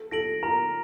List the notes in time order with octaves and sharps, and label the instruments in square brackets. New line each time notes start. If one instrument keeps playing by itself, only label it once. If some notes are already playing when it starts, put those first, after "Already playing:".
Already playing: [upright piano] A4
[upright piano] A4 [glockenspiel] A#6 D7 F#7
[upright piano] A#4 [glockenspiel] A#5